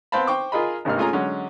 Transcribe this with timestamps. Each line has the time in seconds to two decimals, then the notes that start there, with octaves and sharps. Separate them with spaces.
0.12 B3 C4 C5 F5 A5 B5
0.27 C5 G5 C#6 D6
0.52 F4 G#4 A#4 D#5 B5
0.85 G#1 G2 C3 A#3 D#4 F6
0.97 A3 C#4 F4 G#4 G#5 A#5
1.13 D3 F#3 G#3 C#4